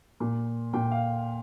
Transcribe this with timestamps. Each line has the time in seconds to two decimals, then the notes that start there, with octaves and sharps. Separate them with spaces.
0.20 A#2
0.73 A#2 G5
0.92 F5